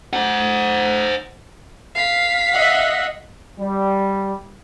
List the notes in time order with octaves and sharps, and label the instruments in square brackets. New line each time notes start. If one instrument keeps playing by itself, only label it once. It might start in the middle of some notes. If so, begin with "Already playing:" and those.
[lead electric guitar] C5 F#5
[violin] F5 B6
[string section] D#5 E5 F#5
[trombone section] G3